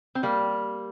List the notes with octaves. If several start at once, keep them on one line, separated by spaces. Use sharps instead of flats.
C4
G3 A#3